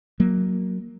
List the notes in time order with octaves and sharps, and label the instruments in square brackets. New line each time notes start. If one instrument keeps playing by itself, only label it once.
[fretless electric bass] F#3 A#3